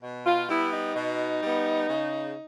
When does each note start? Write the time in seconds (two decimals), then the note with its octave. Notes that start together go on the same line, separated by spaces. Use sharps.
0.02 B2
0.25 F4
0.48 G3 B3 E4
0.71 D#4
0.95 B2
1.41 G3 B3
1.88 C#3